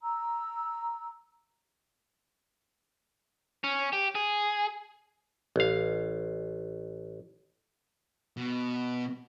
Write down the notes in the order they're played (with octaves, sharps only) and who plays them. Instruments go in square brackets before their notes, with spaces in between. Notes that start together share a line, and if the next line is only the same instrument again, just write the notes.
[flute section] A#5 E6
[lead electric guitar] C#4
G4
G#4
[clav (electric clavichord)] A1 F5
[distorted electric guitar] B2